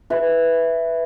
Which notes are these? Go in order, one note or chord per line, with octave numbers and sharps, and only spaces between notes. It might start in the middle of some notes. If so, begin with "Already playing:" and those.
B4 E5